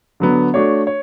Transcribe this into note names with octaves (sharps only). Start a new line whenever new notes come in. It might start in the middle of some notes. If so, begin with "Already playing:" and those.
D3 F#3 B3
A3 D4 F#4 C#5
C#5